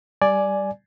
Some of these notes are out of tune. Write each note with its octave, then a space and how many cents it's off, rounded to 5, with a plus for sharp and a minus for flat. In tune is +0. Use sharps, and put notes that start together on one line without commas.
G3 +0 D5 +0 G#5 +10